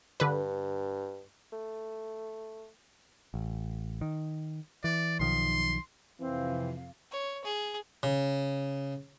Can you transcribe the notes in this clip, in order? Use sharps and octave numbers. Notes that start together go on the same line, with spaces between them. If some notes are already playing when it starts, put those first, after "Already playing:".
G2 D3 B4
A3
A1
D#3
E3 D5
B1 D#3 F3 C6
F2 C3 E3 C4 F5
C#5
G#4
C#3